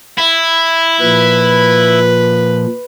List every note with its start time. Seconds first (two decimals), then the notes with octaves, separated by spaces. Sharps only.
0.18 E4 B5
1.01 A#2 F3 B4